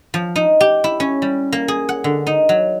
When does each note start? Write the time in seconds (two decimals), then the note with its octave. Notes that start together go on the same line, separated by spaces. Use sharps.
0.14 F3
0.36 D#4
0.61 G4
0.84 E4
1.00 C#4
1.22 G3
1.52 A#3
1.68 G#4
1.89 F#5
2.04 D3
2.27 D#4
2.49 F#3